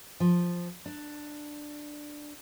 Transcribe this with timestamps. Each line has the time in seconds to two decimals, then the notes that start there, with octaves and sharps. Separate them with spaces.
0.20 F3
0.86 D4